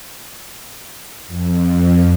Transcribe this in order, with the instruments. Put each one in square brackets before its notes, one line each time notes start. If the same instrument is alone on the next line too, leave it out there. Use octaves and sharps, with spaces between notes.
[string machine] F2